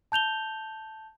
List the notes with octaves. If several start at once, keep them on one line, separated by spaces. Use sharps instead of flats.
A5 G6 F7 G7